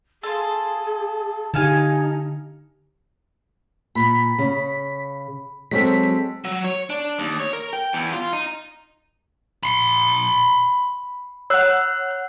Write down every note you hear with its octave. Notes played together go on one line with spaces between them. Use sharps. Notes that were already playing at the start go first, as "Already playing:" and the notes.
F4 G#4 A4
D3 D#4 G4 A4 F5 G#5
A#2 B5 B6
C#3
F#3 G#3 C4 A4 B6
F#3
C#5
D4
D#2
C#5
A#4
G5
E2
F4
D#4
B5 C6
C#5 F#5 E6 F#6